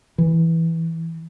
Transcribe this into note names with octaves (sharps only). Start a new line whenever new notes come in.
E3